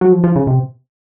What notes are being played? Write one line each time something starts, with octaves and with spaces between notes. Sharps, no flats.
F#3
F3
F3
C#3
C3